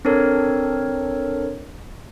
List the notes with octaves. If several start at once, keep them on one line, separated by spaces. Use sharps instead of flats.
C4 D4 A4 A#4 C#5